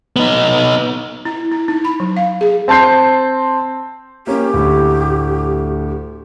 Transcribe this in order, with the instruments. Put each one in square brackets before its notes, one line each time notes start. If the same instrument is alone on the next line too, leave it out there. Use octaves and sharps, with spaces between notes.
[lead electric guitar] B3 D#4
[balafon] E4
E4
D#4
B5
F#3
F5
G#4
[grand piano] C4 A5 C6 G6 C7
[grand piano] A#3 C#4 [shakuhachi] G4
[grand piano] D2 A2